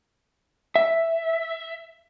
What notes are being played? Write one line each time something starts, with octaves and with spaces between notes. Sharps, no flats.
E5